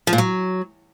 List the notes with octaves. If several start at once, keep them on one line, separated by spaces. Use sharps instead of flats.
F3
A#2
F#3